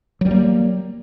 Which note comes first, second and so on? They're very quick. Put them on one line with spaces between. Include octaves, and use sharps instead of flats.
F#3 G3 A#3